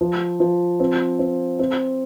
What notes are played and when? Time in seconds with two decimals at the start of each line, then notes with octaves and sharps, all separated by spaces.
0.01 F3
0.40 F3
0.80 C4
1.19 C4
1.59 C4